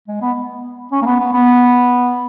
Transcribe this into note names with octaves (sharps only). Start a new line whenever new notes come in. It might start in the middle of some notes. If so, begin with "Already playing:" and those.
G#3
B3
C#4
A#3
B3
B3
B3